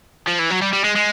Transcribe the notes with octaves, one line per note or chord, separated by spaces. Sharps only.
F3
E3
F#3
G3
G3
G#3
G#3